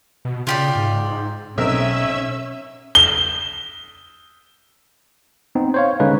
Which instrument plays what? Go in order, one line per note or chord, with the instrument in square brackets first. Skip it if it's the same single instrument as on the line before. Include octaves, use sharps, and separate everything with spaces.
[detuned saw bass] B2
[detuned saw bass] C#3 [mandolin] F4 G4 D5
[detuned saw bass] G#2
[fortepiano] B1 C4 A#4 [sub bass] B2 [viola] C#4 [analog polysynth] E5 E6
[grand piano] G7
[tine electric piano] B3 C4 D#4
C5 C#5 F5
D3 G#3 C#4 D#4 B4 C#5